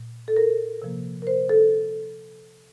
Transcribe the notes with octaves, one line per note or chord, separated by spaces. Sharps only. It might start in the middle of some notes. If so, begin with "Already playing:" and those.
Already playing: A#2
A4
A#4
C3 F3 A#3
A#4
C5
A4